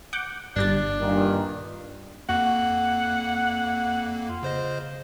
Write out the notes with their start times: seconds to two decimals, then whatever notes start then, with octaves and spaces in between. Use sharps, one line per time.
0.13 F#5 D6 G6
0.56 G1 G3 D4 A6
1.01 G2 A#2 D#3
2.29 F2 A#3 F#5
4.28 F4
4.43 C#3 C5 D#5